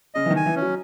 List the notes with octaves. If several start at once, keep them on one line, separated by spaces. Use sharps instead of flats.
C#3 D#5
E3
D#3
G#5
E3
C#4
F#3